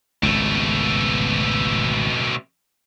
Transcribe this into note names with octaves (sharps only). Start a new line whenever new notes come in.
G#1 C#2 B2 A3